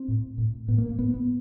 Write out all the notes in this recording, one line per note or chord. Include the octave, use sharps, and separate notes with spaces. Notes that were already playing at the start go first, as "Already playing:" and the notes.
Already playing: C4
A2
A2
A2 B3
A#3
A#3
A2 B3
B3